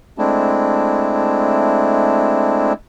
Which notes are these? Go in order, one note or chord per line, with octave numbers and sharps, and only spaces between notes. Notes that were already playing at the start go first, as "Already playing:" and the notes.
G#3 A3 C4 D4 E4